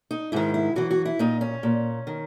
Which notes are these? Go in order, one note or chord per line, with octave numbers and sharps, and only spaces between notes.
D#4
G#2 D#3 E4
E4
F#2 E3 F#4
F#4
E4
A#2 D#4
C#4
A#2
D#3